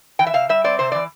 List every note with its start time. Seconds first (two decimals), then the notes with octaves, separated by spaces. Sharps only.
0.19 E3 G5
0.27 E5
0.33 C3 F5
0.49 G3 E5
0.64 C4 D5
0.79 C3 C5
0.92 E3 D5